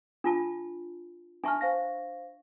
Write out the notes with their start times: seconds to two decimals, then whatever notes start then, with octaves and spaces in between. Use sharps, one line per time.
0.24 D4 F4 A5
1.44 D4 E5 G#5 A5 C#6 F6
1.61 C5 F5 A#6